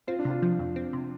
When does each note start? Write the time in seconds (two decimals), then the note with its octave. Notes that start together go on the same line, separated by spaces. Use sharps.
0.07 C4 F4
0.19 D4
0.25 C3 F4
0.42 F3
0.59 F2
0.76 C4
0.93 C3